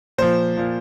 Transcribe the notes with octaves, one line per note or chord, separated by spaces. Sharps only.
A#2 F3 C5
A#2 F3